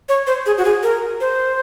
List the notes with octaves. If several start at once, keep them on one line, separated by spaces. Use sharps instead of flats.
C#5
C5
G#4
F#4
G#4
A#4
C5